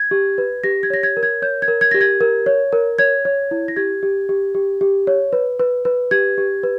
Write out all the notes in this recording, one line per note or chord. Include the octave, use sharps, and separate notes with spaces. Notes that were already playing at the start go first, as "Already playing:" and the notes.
Already playing: G#6
G4
B4
G4 A#6
G#6
C#5 A#6
G#6
A#4
G#6
C#5 G6
G#6
A#4
G#6
G4 A#6
G#6
A#4
C#5
A#4
C#5 G#6
C#5
E4
A#6
G4 G#6
G4
G4
G4
G4
C#5
B4
B4
B4
G4 G#6
G4
B4